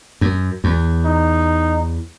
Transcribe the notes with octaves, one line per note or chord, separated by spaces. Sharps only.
F#2
E2
D#4